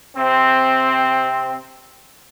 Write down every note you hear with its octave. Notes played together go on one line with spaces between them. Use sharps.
C3 C4